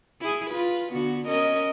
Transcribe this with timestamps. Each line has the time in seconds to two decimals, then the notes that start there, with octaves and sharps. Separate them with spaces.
0.21 E4 G#4
0.50 F4 B4
0.92 D3 B3 F#4
1.27 C#4 A#4 D#5